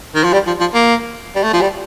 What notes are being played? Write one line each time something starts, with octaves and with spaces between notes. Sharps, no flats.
D#3
F3
G3
F3
F3
A#3
G3
A3
F3
G3